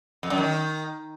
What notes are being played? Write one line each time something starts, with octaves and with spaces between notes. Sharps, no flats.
F2
F#2
D#3